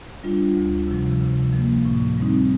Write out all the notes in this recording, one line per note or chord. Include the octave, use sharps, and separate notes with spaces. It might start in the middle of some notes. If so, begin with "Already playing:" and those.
G3 D4 F4
D2
C3 F3
C3
F3 A#3
A2
G3 C4 D#4